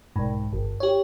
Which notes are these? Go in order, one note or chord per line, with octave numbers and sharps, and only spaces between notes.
B1 G#2
G1
G4 C#5